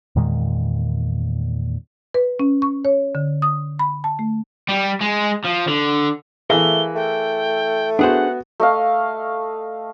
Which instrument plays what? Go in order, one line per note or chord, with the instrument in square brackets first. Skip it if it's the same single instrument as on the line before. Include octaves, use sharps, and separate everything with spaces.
[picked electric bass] E2 A#2 D#3 G#3
[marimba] B4
C#4
C#6
C#5
D3
D#6
B5
A5
A3
[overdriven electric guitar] G3
G#3
F3
D3
[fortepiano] E3 E5 [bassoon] A3 [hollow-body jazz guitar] G#4 A#4 F5 [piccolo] G7
[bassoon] A3 [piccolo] G5
[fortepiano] B3 F#4 [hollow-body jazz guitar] D4 G#4 C5 [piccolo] F#5
[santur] A3 D#5 F5